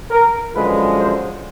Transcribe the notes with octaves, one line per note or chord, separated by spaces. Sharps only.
A#4
F#2 D3 F3 G#3 B4
C5